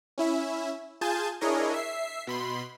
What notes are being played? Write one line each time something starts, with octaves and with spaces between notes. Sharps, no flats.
C#4 E4 E5
F4 G#4 G#5 A5 G6 A6
D4 E4 G#4 A#4 C#5 D#5
E5 C7
B2 B5 C6